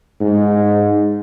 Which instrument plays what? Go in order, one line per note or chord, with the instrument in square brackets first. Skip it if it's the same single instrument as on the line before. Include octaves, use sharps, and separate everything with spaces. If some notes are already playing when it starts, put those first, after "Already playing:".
[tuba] G#2